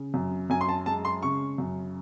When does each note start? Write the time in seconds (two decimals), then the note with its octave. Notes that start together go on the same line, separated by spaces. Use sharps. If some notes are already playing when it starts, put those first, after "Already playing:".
Already playing: C#3
0.14 F#2
0.50 F#2 G#5
0.61 C6
0.69 A5
0.86 G#3 A5
1.05 C6
1.23 C#3 C#6
1.58 F#2